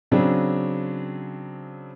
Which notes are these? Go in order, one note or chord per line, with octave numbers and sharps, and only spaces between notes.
C#3 F#3 C4 D4